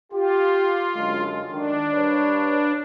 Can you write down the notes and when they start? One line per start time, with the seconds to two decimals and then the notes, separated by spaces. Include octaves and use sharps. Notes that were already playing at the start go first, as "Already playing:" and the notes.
0.12 F4 G4
0.96 F#2 D3 G#3
1.50 D#3 D4
1.91 G2 B4 C#5